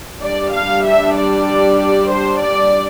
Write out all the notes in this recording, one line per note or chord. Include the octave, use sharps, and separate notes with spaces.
G3 D4 D5
F5
E5
D5
C5
D5